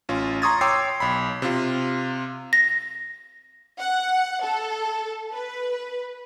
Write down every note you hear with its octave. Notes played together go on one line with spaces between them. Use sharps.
A1 C#4 F4
A#5 C6 C#6 D#6 G#6 A6
C#5 G5 C6 D6 E6 C7
B1 B5
C3 F4
A#6
F#5
A4
B4